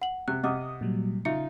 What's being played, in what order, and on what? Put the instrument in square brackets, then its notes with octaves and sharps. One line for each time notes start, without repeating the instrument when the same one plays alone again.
[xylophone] F#5 F#7
[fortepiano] C3 [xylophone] F#6
[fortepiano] C3 [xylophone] D#5 D6 F6 [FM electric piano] F#5 D#6
[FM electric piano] A#2 F#3 G3
[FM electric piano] C#3 [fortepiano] D#4 F4 [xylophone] E5 C#7